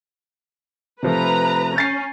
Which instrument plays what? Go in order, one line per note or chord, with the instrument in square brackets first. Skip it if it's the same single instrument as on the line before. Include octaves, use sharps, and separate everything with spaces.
[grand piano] C3 F3 A3 [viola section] B4 A#5
[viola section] C#4 [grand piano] G6 A6 C7